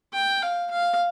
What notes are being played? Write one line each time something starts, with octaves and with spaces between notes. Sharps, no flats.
G5
F5
F5